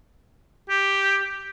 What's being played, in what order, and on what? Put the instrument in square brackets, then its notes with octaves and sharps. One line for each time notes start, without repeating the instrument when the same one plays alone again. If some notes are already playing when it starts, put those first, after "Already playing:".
[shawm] G4